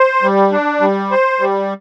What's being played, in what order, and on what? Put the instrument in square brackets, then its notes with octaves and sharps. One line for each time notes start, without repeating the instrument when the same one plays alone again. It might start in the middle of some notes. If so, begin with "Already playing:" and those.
Already playing: [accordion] C5
G3
D4
G3
C5
G3